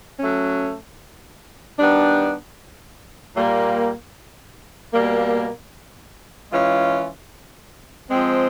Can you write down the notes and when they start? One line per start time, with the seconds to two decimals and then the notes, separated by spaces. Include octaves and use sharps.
0.20 F#3 A3 C#4
1.78 D#3 G3 B3 D4
3.36 A#2 G3 A#3
4.94 B2 G3 A#3
6.52 E3 G#3 C#4 F4
8.10 F3 G#3 C4